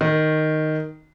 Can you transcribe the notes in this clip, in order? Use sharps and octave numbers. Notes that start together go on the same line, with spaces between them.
D#3